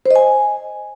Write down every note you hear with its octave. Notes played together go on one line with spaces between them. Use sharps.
C5
D#5
G#5